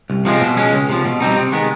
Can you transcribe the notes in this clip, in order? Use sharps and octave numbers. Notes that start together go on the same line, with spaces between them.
C2
C3 F3 G#3 C4
B2
G#3 C#4
C#2
C3 F3
B2
G3 C4 D#4
C3
D#3 G#3 B3